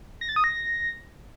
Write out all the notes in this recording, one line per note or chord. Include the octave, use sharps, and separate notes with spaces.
A#6
A6
D#6
A#6